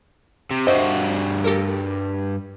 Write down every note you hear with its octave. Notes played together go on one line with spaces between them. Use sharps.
C3
G2 F#4 C5 D#5 E5
G4 A4 A#4